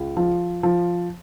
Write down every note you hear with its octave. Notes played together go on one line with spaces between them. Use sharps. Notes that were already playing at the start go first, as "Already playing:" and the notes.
Already playing: C#2
F3
F3